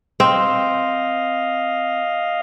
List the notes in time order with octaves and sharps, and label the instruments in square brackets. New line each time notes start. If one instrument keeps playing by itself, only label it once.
[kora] C4 [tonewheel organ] D#5 F5